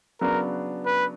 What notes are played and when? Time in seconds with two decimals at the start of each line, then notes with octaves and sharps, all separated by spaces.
0.21 C#3 F#3 B3 D4 A#4
0.86 B4